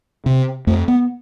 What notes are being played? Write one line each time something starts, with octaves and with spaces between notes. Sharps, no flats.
C3
F2 A3
B3